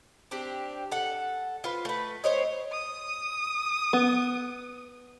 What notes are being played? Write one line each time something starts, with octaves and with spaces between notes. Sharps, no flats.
C4 D4 G4
A4 F#5
F4 B4 C5
A3 B4
C4 C5 C#5 D#5
D#6
B3